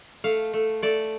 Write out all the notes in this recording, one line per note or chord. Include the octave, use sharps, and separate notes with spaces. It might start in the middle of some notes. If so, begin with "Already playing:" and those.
A3 F5
A3
A3 D5